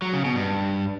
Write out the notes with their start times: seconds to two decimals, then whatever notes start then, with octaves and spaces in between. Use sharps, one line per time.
0.02 F#3
0.13 C#3
0.24 B2
0.36 G2